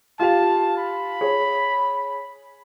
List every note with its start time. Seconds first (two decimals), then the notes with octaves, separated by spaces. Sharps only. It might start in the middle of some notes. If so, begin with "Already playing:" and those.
0.19 F4 G4 F5 A5
0.77 B5
1.21 G#4 C#5